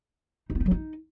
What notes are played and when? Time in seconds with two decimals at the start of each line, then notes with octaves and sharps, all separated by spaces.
0.50 D#4
0.55 B3
0.60 D#4
0.66 F#3
0.71 D#4